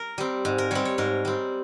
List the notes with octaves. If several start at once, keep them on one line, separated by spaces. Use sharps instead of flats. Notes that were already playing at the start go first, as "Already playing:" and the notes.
Already playing: A#4
G3 C4
G#2
A#4
G3 C4 C#5
C#5
G#2 A#4
G3 C4